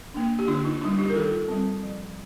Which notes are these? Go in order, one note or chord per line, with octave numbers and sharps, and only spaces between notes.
A#3 D4
G4
D3 D4 F4
D#4
G3 D4 D#4
D#4 G4
A#4
D#3 F4 A4
G3 C4
F3